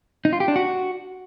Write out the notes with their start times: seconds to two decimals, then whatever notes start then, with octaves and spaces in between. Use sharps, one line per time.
0.25 D#4
0.33 F4
0.40 G4
0.48 D4
0.56 F#4